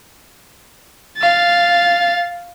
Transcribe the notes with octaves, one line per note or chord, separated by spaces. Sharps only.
F5 A6